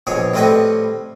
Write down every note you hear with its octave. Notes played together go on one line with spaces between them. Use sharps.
A#1 B2 G#4 C#5
A2 G3 C4 B4 D#5 C#6